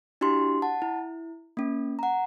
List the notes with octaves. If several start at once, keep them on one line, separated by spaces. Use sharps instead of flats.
D4 E4 F#4 G4 C6
F#5 A5
E4
A#3 C#4
F#5 A#5